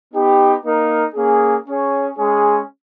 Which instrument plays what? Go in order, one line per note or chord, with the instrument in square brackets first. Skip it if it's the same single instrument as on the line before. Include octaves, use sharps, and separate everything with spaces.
[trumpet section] B3 D#4 G4
A#3 D#4 A#4
A#3 C#4 G#4
C#4 G#4 C#5
G#3 C#4 G#4